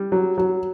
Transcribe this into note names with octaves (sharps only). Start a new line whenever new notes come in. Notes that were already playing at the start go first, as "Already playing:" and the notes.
Already playing: G3
F#3
F#3